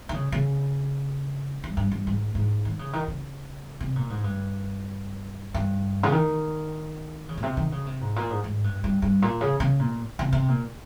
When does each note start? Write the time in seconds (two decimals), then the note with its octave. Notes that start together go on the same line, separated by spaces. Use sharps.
0.09 D#3
0.14 C#3
0.32 C#3
1.64 G2
1.77 G2
1.91 G2
2.07 G#2
2.35 G#2
2.65 D#3
2.79 C#3
2.93 D#3
3.08 C#3
3.80 C3
3.96 A#2
4.10 G#2
4.24 G2
5.54 G2
6.03 C#3
6.12 D#3
7.29 C#3
7.37 A#2
7.43 C3
7.57 D#3
7.72 C#3
7.87 C3
8.01 G#2
8.16 A#2
8.30 G#2
8.44 G#2
8.64 G2
8.84 G2
9.02 G2
9.22 A#2
9.41 C#3
9.60 C#3
9.79 A#2
10.19 C3
10.32 C3
10.48 A#2